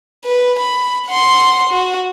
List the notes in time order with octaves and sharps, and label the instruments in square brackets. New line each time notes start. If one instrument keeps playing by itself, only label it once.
[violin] B4
B5
F#5 C6
F#4